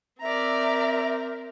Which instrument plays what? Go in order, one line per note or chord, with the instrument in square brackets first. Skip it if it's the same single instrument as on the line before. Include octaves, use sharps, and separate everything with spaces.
[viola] C4 A#4 [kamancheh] D5 A#5 [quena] E5